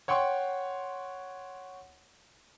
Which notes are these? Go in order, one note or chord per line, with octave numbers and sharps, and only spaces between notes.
C#5 F#5 G5 C6 C#6